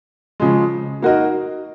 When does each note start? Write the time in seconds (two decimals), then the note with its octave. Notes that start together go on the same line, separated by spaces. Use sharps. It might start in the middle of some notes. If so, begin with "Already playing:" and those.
0.40 C#3 F3 G#3
1.02 A#3 D#4 F#4 A#4 D#5